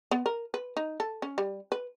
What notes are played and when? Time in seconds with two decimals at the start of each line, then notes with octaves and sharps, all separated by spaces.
0.11 B3
0.26 A#4
0.54 B4
0.77 D#4
1.00 A4
1.22 C#4
1.38 G3
1.72 B4